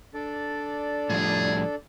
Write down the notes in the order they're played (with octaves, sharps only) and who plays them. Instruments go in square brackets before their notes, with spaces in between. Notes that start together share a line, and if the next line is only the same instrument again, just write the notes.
[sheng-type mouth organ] D4 A4 D5
[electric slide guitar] A2 F3 G3 [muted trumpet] G#4